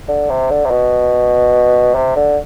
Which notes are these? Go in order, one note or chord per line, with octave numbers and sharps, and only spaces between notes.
D3
C3
D3
C3
B2
C3
D3